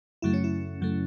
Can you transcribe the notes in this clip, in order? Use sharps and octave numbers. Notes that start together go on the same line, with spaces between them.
F#2 C#3 F#3 A3 E4
C#4
E4
F#2 C#3 F#3 A3